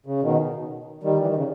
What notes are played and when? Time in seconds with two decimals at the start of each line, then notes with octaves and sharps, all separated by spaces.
0.06 C#3
0.22 B2 D#3
1.03 D#3 G3
1.19 E3
1.27 D#3
1.36 C#3